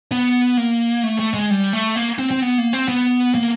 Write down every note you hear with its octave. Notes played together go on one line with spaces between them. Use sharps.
B3
A#3
A3
A3
G#3
G3
A3
A#3
C4
C4
B3
A#3
C4
B3
A#3